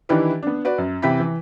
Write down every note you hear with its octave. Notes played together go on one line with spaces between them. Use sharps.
D#3 E3 D4 E4 G4 B4
B3 D4
F#4 B4 D5
F#2
C3 E3 E5 G5 B5 B6
E3